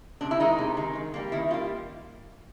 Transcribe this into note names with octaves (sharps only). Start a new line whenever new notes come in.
C3 D4
E4
D#3 G#3 D#4
C3
D#3 G#3
D#3
G3 A#3
D#3 E4
G3 A#3 F4